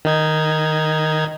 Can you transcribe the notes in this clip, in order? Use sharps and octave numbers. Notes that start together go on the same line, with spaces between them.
D#3 D#4 G#6